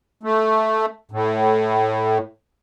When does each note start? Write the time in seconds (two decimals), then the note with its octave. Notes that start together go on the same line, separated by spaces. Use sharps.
0.23 A3
1.11 A2